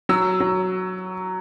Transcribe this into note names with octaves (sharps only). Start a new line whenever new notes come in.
F#3 E6
F#3